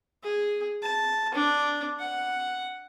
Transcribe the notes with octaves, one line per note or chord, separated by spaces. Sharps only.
G#4
A5
D4
F#5